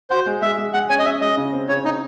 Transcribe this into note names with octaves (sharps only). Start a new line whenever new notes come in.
F#4 C5
G#3
G#3 E5
G#3
G#3 F#5
C#4 G#5
D#5
C#4 E5
G#3 D#5
C#3
C4
C#3 C#5
C4 D#4